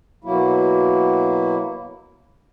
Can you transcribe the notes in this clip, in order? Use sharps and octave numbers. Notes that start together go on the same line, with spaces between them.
B2 F#3 A#3 E4